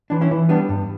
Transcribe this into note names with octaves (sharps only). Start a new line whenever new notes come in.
E3 D4
C#4 E4
E3
G3 B3 D4
G2